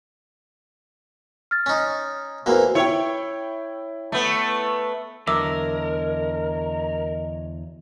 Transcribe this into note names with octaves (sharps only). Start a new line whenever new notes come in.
F6 A6
C#4 D#4
E2 E3 A#3 F#4 B4 C5
E4 C#5 G5
A3 B3
E2 D3 F#3 A#4 D#5 E5 D6 E6